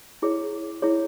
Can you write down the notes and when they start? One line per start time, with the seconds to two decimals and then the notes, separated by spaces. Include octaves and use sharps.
0.22 E4 G#4 C#5
0.82 E4 G#4 C#5